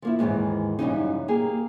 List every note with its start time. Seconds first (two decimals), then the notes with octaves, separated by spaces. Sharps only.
0.02 F3 A#3 E4
0.19 D#2 G#2 C3 D#3 E3
0.79 F#2 A2 C#3 E3 G3 D#4
1.28 A#3 G4 G#4